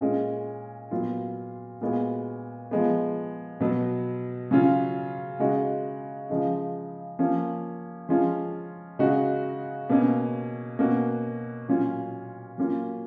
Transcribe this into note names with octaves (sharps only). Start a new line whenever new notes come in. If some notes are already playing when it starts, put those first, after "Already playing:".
A#2 G#3 C#4
A#2 F#3 B3 F4
A#2 G#3 B3 F#4
F3 G#3 B3
B2 F#3 B3
C#3 F#3 C#4 F4
C#3 G#3 D#4 F#4
C#3 F3 G#3 D#4
F3 A#3 C#4
F3 G#3 C#4 F4
C#3 G#3 D#4 F#4
B2 A#3 C#4
B2 A#3 C#4 F#4
A#2 F#3 C#4 F4
F#3 A#3 C#4 F4